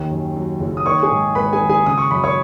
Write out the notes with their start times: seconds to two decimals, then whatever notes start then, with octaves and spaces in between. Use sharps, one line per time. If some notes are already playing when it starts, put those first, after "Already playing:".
Already playing: D#2 D#3
0.11 F#2
0.36 F#3
0.60 F#1
0.77 D#6
0.86 D#3 C#5 C#6
1.02 G#4 G#5
1.11 G#2
1.35 G#1 B4 B5
1.53 G#4 G#5
1.61 G#1
1.69 G#4 G#5
1.86 C#3 D#6
1.98 C#6
2.11 F#2 B5
2.24 C#5 C#6